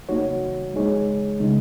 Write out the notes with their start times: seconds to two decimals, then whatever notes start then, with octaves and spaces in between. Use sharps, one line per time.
0.09 A#3 D#4 F#4 C#5
0.74 G#3 D#4 G#4 C#5
1.40 C#3 G#3 D#4